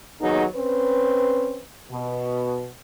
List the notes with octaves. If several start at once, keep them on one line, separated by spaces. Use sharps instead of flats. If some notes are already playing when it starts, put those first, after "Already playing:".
D#2 F#3 B3 D#4 G#4
C4 C#4 B4
B2